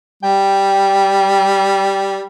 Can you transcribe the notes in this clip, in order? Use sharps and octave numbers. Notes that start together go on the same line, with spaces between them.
G3 G5